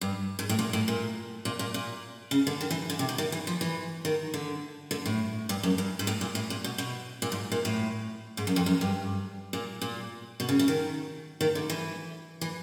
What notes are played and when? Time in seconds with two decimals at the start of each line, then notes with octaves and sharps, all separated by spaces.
0.01 G2
0.39 G#2
0.49 A2
0.59 A#2
0.73 A2
0.88 A#2
1.45 A#2
1.59 A#2
1.74 A#2
2.31 C#3
2.47 D3
2.61 D#3
2.71 E3
2.90 D3
2.99 C3
3.09 B2
3.18 D#3
3.32 E3
3.47 F3
3.61 E3
4.05 D#3
4.34 D3
4.91 D3
5.06 A2
5.49 G2
5.63 F#2
5.78 G2
5.99 G#2
6.07 A2
6.21 A#2
6.35 A2
6.50 A#2
6.64 B2
6.78 B2
7.22 A#2
7.32 G#2
7.52 A#2
7.65 A2
8.37 G#2
8.47 F#2
8.56 F2
8.66 F#2
8.81 G2
9.53 A#2
9.82 A#2
10.40 B2
10.49 C#3
10.59 C#3
10.68 D#3
11.41 D#3
11.55 D3
11.70 E3
12.41 E3